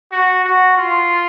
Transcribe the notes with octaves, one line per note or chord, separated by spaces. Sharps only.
F#4
F#4
F4